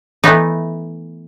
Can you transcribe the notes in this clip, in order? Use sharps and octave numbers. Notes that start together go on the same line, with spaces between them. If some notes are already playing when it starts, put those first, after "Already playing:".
E3 A3 B3 D#4